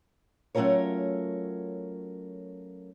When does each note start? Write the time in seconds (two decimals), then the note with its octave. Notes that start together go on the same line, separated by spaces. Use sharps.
0.55 F#3 A3 C#4 F4 A#4 C#5